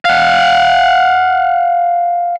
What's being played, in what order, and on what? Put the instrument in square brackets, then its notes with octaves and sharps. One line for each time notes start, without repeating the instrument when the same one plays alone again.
[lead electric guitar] F5 F#5